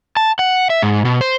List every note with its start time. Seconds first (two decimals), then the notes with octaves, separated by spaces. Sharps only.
0.17 A5
0.39 F#5
0.70 E5
0.82 G#2
1.05 B2
1.21 C5